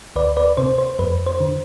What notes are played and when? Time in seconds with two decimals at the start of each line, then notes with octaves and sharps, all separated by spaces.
0.16 D2 B4 D5
0.37 B4 D5
0.57 C3 C5
0.78 C5
0.99 F2 B4
1.26 C5
1.40 D3